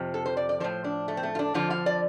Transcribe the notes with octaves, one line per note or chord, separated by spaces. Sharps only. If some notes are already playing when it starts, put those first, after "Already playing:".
Already playing: F2 C3 F3
A4
C5
D5
D5
A2 F3 C5
D4
A3
C4
A3
F4
D4
F2 D3 F3 F4
F5
D5